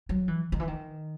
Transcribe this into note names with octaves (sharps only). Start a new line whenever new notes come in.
F#3
E3
D#3
E3
D#3